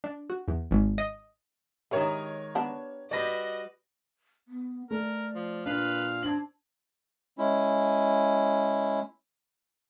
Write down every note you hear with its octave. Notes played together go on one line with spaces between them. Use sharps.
D4
F#4
E2
G#1
D#5
D#3 G#3 E4 G4 A#4 C#5
B3 D4
G3 F#4 B4 D5 D#5 A#6
B3
A3 A#4 D5
F3
A#2 D4 B4 F5 F6
C4 D4 G#6 F#7
G#3 C#4 E4